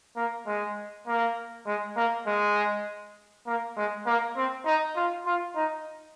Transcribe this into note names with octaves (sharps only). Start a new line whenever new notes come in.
A#3
G#3
A#3
G#3
A#3
G#3
A#3
G#3
A#3
C4
D#4
F4
F4
D#4